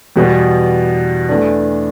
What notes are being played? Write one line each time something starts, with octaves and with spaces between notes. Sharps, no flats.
E2 B2 G3 B3
E2 E3 A3 D4